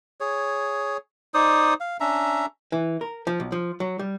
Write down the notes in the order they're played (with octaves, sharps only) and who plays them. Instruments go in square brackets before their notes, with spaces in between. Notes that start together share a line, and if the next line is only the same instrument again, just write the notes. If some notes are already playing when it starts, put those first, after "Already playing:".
[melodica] G#4 C#5
D#4 C5 D5 D#6
F5
C#4 D4 E5 A#5
[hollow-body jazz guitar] E3
A#4
F3
B1
F3
F#3
G3